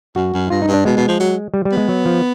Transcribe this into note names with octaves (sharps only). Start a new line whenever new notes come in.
F#2 F#4
F#2
G2 F4
D#4
G2
D4
B2 G#3
B2
F3
F#3
G3
G3
B3
G#3
F#3
F3